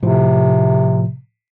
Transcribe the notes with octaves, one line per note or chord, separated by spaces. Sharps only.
A2 C3 F3